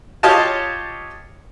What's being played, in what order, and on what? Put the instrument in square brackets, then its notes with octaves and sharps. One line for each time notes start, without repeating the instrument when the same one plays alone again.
[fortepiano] F4 G4 C#5 D#5 F5 A5